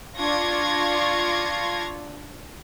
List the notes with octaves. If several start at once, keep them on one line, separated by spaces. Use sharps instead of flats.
D4 F4 C#6 G#6 A#6